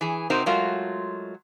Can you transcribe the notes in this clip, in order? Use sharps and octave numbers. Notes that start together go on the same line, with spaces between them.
E3 G#4
C3 C4 D#4 F#4 A#4 C5
F#3 G#3 A3 F4 F#4 A#4